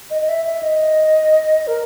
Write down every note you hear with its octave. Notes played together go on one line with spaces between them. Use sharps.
D#5
D#5
E5
E5
D#5
A#4